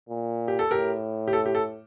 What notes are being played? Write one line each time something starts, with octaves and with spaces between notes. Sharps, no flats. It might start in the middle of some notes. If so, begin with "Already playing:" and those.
A#2
G4
A4
A2 G4 A#4
G4
A4
G4
A4